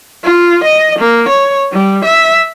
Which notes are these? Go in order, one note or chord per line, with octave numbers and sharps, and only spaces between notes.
F4
D#5
A#3
C#5
G3
E5